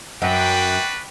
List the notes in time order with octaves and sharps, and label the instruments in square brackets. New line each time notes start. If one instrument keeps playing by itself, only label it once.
[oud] F#2 [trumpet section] D4 F#4 B4 [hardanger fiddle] G5